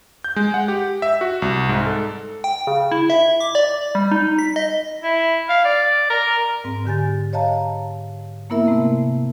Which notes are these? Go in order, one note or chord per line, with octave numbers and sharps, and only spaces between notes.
G6
G#3
F#5
G4
E5
F#4
C2
G#2
A4
G5
C#3
E4
E5
D6
D5
G3
D#4
B6
D#5
E4
F5
D5
A#4
G#2 C4
D3 G4 G#5 A6
C#5 D#5 F5 A5 A#5
A#3 B3 E4 A#4 E5
C3 A3 C4